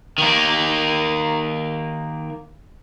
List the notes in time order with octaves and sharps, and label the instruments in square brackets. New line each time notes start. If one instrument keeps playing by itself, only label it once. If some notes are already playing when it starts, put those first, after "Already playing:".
[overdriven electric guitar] D#3 A#3